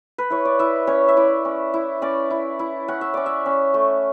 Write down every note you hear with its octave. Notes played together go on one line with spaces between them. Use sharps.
B4
E4 C#5
D5
E4 E5
C#4 C#5
E5
E4 D5
C#4
E4
C#4 D5
E4
E4
C#4 F#5
E5
C#4 D5
E5
C#4
A3